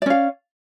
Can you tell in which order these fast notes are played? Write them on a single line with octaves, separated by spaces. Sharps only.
D5 C#4 F5